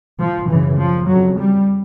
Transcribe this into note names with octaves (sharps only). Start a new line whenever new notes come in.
F3
F#2 C#3 E3
F3
F2 C#3 F#3
G3